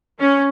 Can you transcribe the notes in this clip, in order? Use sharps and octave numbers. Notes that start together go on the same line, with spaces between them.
C#4